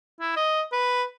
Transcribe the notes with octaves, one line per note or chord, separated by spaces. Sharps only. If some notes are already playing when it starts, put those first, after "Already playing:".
E4
D#5
B4